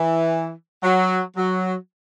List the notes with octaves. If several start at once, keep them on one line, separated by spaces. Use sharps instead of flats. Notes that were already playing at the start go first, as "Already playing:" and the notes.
Already playing: E3
F#3
F#3